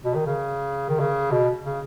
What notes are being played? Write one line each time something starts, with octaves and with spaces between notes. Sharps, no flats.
B2
D#3
C#3
D#3
C#3
B2
C#3